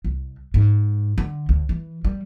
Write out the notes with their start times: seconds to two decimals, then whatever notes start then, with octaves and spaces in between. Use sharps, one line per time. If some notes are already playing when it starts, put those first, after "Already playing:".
0.04 C2
0.54 G#2
1.18 D3
1.49 D2
1.69 E3
2.05 G3